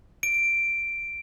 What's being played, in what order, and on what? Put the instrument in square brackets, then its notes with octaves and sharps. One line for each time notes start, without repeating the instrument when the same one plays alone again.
[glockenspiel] D7